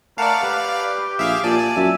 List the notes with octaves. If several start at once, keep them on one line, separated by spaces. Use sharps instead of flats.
A3 A#4 D5 F5 F#5 A5
G4 B4
A#1 G#4 E5 F5
A#2 D5 G#5 A5
F#2 E5